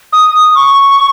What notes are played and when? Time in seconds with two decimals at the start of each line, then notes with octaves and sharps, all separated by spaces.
0.13 D#6
0.55 C#6